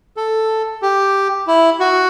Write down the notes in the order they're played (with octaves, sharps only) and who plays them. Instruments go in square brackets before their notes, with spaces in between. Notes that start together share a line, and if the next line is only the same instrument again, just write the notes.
[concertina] A4
G4
E4
F#4